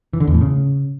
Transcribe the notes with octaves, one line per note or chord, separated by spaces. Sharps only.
E3
D3
E2
A2
C#3